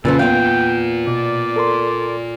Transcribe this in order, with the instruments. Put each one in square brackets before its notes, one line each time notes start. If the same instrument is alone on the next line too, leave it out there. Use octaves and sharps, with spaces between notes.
[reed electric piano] E2 [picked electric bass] A#2 [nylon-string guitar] C#3 B4 C5 [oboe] A4
[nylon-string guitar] B3 F5 [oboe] G5
[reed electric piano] B2 [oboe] D5
[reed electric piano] A4 A#4 C6